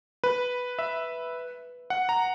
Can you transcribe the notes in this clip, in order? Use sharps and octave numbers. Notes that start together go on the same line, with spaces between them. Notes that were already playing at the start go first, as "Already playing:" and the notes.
B4
E5
F#5
A#5